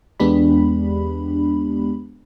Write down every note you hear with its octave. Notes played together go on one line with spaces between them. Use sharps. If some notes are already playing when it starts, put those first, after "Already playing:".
E2 G#3 B3 D4 G4 B5